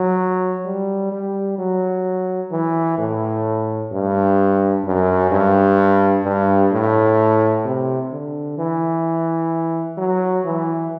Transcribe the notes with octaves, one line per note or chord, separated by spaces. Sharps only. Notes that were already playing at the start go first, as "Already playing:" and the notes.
Already playing: F#3
G3
G3
F#3
E3
A2
G2
F#2
G2
G2
A2
C3
D3
E3
F#3
E3